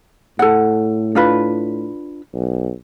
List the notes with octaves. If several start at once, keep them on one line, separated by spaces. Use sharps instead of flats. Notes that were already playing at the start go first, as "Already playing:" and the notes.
A2 A4 F#5
D4 F4 B4
B1